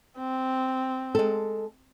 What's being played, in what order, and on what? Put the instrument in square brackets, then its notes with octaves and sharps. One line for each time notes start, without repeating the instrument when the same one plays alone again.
[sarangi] C4
[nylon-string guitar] G#3 A4